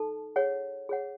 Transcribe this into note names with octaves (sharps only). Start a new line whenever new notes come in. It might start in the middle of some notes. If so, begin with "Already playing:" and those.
Already playing: D#4 A4 A5
G#4 C#5 F#5
G#4 C#5 F#5